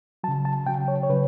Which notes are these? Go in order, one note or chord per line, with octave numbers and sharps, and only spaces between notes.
C#3 F#3 A5
A5
C#3 F#3 G5
C#5
C#5
C#3 F#3 B4